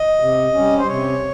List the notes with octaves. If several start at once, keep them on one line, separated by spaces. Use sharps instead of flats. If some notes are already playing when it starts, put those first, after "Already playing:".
Already playing: D#5
C3
G3 C#4
C5
C3 C#5